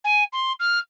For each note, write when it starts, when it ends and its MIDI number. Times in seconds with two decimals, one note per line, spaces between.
0.04 0.24 80
0.32 0.52 84
0.59 0.79 89